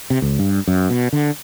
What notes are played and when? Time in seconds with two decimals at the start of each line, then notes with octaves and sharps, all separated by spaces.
0.10 C3
0.22 C#2
0.39 G2
0.68 F#2
0.90 B2
1.13 D3